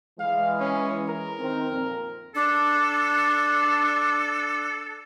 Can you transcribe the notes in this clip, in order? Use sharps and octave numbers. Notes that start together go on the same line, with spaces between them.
E3 G#3 F5
C#4
A#4
D#3 C4
F2 A#2
D4 A4